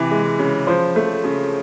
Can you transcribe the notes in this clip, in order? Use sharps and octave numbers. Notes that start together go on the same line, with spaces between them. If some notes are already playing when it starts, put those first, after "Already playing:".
Already playing: C3 E3
G#3
C#3
F3 C5
A3
C#3